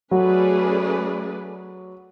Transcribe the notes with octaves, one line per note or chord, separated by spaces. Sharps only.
F#3 A3 C#4 G#4 B4 D5